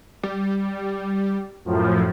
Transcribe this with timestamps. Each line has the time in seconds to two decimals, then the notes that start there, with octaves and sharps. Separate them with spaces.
0.23 G3
1.65 F#2 A2 F3